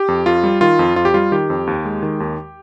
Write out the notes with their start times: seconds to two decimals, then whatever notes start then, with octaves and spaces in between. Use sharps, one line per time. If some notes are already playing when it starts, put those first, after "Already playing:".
Already playing: G4
0.08 F2
0.26 F2 F4
0.43 G3
0.61 D#3 F4
0.79 F2
0.96 F2 F4
1.05 G4
1.14 G3 F4
1.32 D#3 G4
1.50 F2
1.67 D#2
1.85 G#3
2.03 D#3
2.20 D#2